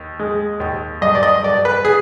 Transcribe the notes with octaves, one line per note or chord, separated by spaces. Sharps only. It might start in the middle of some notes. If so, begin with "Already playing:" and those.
Already playing: D#2
G#3
D#2
G2 D#5
D5
D#5
G2 D5
B4
G#4